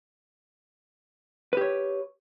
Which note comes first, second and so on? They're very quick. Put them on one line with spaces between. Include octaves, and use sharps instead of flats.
B4 G4 C#5